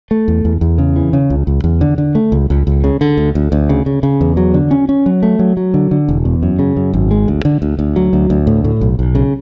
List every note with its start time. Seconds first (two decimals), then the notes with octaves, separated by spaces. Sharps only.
0.11 A3
0.28 E2
0.45 E2
0.61 E2
0.78 C#3
0.96 E3
1.13 C#3
1.30 C#2
1.47 C#2
1.64 E2
1.81 D3
1.98 D3
2.15 A3
2.32 C#2
2.50 C#2
2.67 C#2
2.84 C#3
3.01 D3
3.17 D2
3.35 D2
3.52 D2
3.69 C#3
3.86 C#3
4.03 C#3
4.21 E2
4.37 F#3
4.54 D3
4.71 C#4
4.89 C#4
5.06 F#3
5.23 A3
5.39 F#3
5.57 F#3
5.74 D3
5.91 D3
6.08 E1
6.25 E2
6.43 F#2
6.59 C#3
6.76 F#2
6.93 G#1
7.11 G#3
7.28 D2
7.45 D3
7.62 D2
7.79 D2
7.96 F#3
8.13 D2
8.30 D2
8.47 A2
8.64 A2
8.81 B1
8.99 B1
9.15 C#3